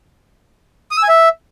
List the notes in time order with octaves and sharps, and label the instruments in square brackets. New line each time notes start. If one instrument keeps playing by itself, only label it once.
[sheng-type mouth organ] D#6
E6
G#5
E5